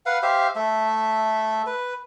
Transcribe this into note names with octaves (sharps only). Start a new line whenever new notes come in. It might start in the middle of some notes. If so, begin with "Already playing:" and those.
B4 F5 F#5
G4 C5 E5 F5
A3 E5
B4